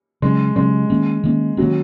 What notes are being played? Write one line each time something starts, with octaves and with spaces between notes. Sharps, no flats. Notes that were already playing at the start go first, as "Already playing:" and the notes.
C#3 F#3 G#3 C#4
C#3 F#3 G#3 C#4
D#3 A#3 C#4
D#3 A#3 C#4
D#3 F#3 A#3 C#4